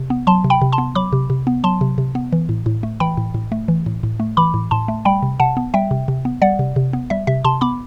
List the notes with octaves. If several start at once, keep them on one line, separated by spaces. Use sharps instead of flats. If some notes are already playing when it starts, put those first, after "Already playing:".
Already playing: C3
B3
F#3 A5 C6
C3
G5 B5
C3
A5 C6
B3
F#3 B5 D6
C3
C3
B3
F#3 A5 C6
C3
C3
B3
E3
A2
A2
A3
E3 G5 B5
A2
A2
A3
E3
A2
A2
A3
E3 B5 D6
A2
A2 A5 C6
A3
G3 G5 B5
C3
C3 F#5 A5
B3
G3 E5 G5
C3
C3
B3
G3 D5 F#5
C3
C3
B3
G3 E5
C3 E5
C3 A5 C6
B3 B5 D6